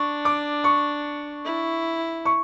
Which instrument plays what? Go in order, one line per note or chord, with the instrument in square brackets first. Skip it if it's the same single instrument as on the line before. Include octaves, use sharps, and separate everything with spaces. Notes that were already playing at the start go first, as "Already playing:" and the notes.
Already playing: [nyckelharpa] D4 [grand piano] C#6
[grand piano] D6
C#6
[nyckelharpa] E4
[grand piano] C#6